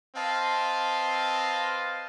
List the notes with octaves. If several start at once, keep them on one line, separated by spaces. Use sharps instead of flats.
C4 B4 D#5 F5 A5 C6